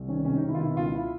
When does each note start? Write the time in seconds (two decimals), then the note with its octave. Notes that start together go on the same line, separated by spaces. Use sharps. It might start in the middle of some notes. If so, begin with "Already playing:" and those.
Already playing: C2
0.08 D#3 C#4
0.25 C3 C#4
0.37 D#4
0.43 D#3
0.48 E4
0.54 F4
0.60 B2 E4
0.77 C#2 F4
0.94 E4